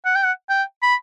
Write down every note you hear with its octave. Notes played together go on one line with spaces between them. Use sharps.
F#5
G5
F#5
G5
B5